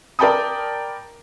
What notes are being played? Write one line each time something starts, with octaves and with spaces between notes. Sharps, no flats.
A#4 D5 G5 A5 B5 D#6